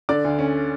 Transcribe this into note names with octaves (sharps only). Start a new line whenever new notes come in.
D3 D5 D6
D2
C#4